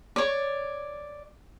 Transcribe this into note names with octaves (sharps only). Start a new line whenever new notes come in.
C#5 D5